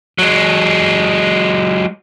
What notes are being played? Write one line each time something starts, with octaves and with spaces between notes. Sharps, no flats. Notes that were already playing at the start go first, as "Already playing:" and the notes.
F#3 G#3